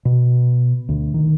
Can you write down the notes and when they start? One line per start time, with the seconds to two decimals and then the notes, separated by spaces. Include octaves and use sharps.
0.05 B2
0.89 D2
1.14 D#3